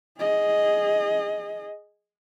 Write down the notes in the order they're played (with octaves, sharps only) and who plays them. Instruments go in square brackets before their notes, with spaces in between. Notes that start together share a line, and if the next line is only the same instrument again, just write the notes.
[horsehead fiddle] G#4 D#5